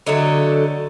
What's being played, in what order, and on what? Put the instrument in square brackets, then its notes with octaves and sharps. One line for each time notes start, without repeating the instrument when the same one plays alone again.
[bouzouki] D3 F#3 A3 C#5 D#5